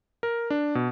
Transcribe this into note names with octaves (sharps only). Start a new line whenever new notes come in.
A#4
D4
B2